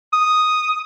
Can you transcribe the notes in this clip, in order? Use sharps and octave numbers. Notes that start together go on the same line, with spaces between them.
D#6